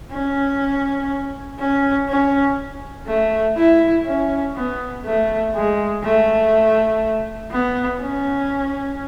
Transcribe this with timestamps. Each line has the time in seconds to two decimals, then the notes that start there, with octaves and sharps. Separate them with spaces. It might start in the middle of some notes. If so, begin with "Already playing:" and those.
0.12 C#4
1.59 C#4
2.09 C#4
3.07 A3
3.57 E4
4.06 C#4
4.56 B3
5.05 A3
5.54 G#3
6.04 A3
7.51 B3
8.01 C#4